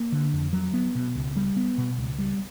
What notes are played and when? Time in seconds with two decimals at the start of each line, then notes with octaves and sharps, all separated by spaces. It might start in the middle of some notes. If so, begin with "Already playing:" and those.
Already playing: A#3
0.12 D3
0.33 F2
0.53 F#3
0.74 B3
0.95 B2
1.15 C#2
1.36 G3
1.56 B3
1.78 B2
1.98 C#2
2.19 G3